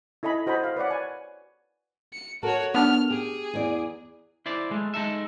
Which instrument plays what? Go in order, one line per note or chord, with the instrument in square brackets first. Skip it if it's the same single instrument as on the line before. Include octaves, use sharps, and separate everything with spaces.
[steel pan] E4 A4 D#5 G#5 B5
F#4 C5 D#5 G#5 B5
F5
B4 C#5 D5 F#5
G#5
[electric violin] C#7
[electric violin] F#4 C#5 [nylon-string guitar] A4 A#4
[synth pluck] B3 D4 [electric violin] F6
[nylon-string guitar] G4 [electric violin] G#4
[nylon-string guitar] E2 D5
[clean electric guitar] E4 C5 D5
G#3 A3
G#3 D#4 A4 E5